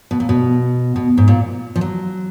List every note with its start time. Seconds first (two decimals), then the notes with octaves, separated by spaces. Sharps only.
0.11 B2
0.20 A#2
0.29 B2
0.96 B2
1.18 G#2
1.28 A#2
1.76 F3
1.81 F#3